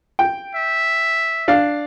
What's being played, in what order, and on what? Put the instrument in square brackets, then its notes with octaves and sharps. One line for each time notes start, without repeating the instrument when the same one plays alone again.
[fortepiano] G5
[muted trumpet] E5
[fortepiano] D4 F5